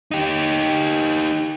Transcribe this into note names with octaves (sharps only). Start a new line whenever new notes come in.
D#4 G4